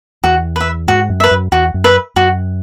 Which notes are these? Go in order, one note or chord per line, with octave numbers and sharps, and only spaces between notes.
E2 F#4
B4 E5
G#2 F#4
F#2
B4 E5
F#2
E2 F#4
F#2
B4 E5
F#2 F#4